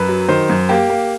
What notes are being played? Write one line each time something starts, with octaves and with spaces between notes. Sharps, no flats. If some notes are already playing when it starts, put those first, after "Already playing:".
Already playing: F#2 B4
F#3
D#3 C5
F#2
A#3 G4
A#3